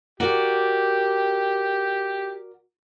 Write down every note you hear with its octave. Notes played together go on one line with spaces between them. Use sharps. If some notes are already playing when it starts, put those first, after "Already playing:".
F#4 G4 A#4 D5